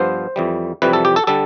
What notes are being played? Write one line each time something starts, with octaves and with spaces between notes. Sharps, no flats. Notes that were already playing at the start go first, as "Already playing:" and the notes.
Already playing: G2 F3 B3 C5
F2 E3 G3
F2 C3 E3 G3 B4
A4
G4
A4
D3 G3 A4